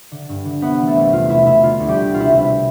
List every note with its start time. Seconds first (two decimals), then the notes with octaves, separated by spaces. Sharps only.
0.12 D3
0.29 G2
0.45 D3
0.62 C2 B3 B4
0.79 E3
0.87 A3 A4
0.96 C2
1.12 E2 F4
1.29 B2 E4
1.46 B2 E4
1.63 D3 F4
1.80 D2
1.88 G3 G4
1.97 D2
2.13 B2 F4
2.20 E4
2.30 C2
2.35 E4